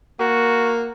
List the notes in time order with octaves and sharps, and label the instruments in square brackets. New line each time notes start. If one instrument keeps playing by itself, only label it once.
[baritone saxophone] A#3 [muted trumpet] F#4